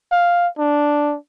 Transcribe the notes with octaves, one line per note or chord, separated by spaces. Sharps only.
F5
D4